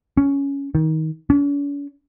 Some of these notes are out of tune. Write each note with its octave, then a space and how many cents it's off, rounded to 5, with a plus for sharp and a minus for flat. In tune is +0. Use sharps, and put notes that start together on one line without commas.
C#4 +10
D#3 +25
C#4 +45